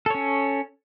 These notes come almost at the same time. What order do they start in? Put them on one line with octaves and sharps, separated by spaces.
A4 C#5 C#4